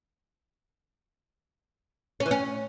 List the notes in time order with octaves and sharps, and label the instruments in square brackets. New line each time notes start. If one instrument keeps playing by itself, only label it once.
[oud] C#4
E3
C#4